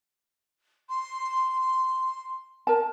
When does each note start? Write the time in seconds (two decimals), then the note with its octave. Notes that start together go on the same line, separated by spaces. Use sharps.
0.89 C6
2.67 A#4 A5